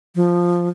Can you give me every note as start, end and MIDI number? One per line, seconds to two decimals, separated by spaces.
0.15 0.69 53